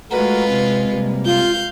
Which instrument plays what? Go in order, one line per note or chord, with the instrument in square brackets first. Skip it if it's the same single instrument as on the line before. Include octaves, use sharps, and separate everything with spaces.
[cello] G#3 [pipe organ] A3 F#4 A#4 [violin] F4 B4
[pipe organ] C3
C3 G3 A#3
[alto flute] F4 [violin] F5 G6